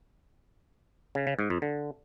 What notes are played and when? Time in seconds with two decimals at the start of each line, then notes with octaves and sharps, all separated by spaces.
1.15 C#3
1.27 C#3
1.39 G#2
1.50 F2
1.62 D3